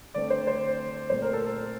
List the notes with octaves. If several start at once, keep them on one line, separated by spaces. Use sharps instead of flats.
D3 A3 C4 D5
C5
C5
A#2 A3 C4 C5
A#4
A4
A4